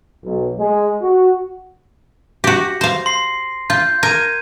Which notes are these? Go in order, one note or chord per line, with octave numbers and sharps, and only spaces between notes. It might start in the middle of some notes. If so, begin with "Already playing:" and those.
B1
G#3
F#4
F#4 G4 A#6
C5 F5
C6 C7
F4 G6
A#4 G#6 D#7